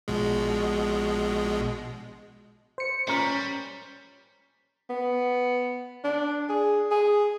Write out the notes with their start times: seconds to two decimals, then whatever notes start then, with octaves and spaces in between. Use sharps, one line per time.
0.08 A#1 B2 G#3
2.78 C5 C#7
3.08 A1 A#2 G3 C#4 A#4
4.90 B3
6.04 D4
6.49 G#4
6.91 G#4